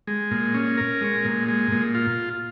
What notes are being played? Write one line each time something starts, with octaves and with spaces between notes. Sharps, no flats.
G#3
A#2
C#4
A#4
G#3
A#2
G#3
A#2
F4